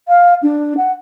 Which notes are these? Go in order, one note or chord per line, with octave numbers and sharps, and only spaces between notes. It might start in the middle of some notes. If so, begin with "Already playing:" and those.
F5
D4
F#5